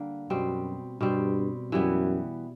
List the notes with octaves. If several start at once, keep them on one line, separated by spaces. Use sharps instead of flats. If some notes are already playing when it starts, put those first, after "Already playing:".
Already playing: D3 G3 A#3
F#2 B2 G3 C4
G2 B2 G3 C4
F#2 E3 G3 B3 E4